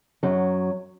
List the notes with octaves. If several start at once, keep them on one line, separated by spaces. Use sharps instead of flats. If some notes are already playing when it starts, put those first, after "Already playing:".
F#2 F#3